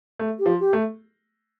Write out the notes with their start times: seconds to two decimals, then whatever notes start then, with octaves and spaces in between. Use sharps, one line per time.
0.19 A3
0.39 G4
0.46 F3
0.60 G4
0.73 A3